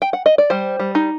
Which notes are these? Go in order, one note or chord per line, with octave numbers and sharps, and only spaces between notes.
G5
F#5
D#5
D5
G3 C5
G3
D#4